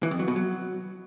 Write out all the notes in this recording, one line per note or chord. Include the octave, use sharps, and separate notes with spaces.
E3
F2
F#3
B2
F#3